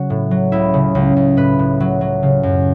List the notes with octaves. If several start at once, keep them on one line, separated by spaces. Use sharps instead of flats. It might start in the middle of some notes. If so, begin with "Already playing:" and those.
Already playing: C#3 F#3 F#4
A2
F#3
C#2 E4
C#3
C#2
C#2
A2 B4
A2
F#3
F#3
C#3
F#2